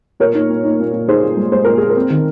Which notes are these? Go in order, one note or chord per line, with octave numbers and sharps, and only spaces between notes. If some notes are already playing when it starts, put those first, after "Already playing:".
A#2 A#4 C#5
D#4
A#2
D#4
A#2
A#2
D#4 G#4 C5
A#2
G#3
G#3 C5
A#2 A#4
A#2 G#4
A#4
C4
D#3